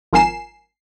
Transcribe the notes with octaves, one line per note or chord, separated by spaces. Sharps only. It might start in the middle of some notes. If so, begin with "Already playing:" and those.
G#1 F3 A#4 G#5 C7 E7